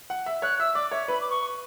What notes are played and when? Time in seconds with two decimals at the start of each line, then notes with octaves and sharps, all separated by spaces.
0.10 F#5
0.26 E5
0.42 C#5 F#6
0.59 E5 E6
0.75 D5 D6
0.91 C#5 E5
1.08 B4 B5
1.21 D6
1.30 C#6